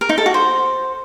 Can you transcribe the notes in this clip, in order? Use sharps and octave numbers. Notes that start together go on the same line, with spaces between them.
A#4
D#4
A4
F#4
C5